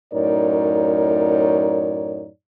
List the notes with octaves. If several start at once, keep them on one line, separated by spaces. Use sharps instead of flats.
F#2 A2 D#4 A#4 C#5 D5